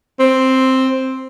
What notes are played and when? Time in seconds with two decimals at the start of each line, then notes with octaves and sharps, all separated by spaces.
0.19 C4